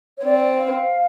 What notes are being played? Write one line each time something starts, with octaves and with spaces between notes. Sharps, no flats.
C#5
C4 D5
F5